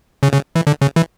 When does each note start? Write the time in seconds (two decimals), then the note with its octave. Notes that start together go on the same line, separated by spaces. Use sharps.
0.23 C#3
0.33 C#3
0.55 E3
0.67 D3
0.81 C#3
0.96 E3